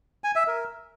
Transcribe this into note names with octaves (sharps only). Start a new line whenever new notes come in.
G#5
E5
A#4